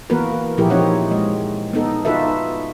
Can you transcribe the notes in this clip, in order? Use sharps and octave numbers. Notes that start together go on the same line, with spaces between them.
E3 A#3 B3 F#4 A#4 B4
A#2 F3 E4 G4 G#4 A#4
F3 C4 D#4 C#5 F#5
G#3 D#5
B3 D#4 A4
D#4 F4 F#4 A4 B4 E5